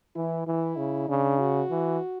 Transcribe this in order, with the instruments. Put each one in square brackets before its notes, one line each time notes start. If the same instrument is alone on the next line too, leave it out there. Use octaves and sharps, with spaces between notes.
[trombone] E3 [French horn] E4
[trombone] E3 [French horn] E4
[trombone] C#3
[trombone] C#3 [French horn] D4
[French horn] F#4
[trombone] E3